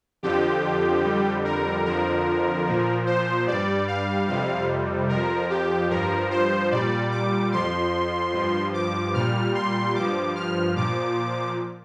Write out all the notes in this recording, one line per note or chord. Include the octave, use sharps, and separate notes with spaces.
F2 D3 F3 G4
F2 D3 G3
A#4
F2 D3 F3 A#4
A#2 F3
C5
G2 G3 D5
F5
F2 C3 G3 F5
F2 F3 A#4
G4
G2 F3 A#4
C5
A#2 G3 D5
D6
F2 F3 C6
G2 F3
D6
A#2 G3 F6
C6
G2 F3 D6
F6
A#2 F3 D6